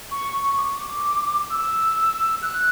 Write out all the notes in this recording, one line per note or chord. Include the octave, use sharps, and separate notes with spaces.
C#6
D6
E6
F#6